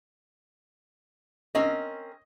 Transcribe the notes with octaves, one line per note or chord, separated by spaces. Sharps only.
C4 C#4 A#4 D#5